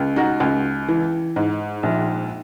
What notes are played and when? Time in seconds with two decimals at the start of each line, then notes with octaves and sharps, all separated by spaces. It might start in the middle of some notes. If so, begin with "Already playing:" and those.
Already playing: C#2
0.16 D#4 F#4
0.40 C#2
0.88 E3
1.36 G#2
1.83 A#1